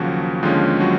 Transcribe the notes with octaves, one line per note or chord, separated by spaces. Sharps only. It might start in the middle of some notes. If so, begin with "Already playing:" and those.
Already playing: D#2 C#3 F3 F#3 F#4
D#2 D3 F3 G#3 C#4 F4
F#3 F#4